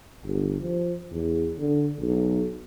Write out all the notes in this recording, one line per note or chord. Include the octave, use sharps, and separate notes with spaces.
G1
F3
E2
D3
B1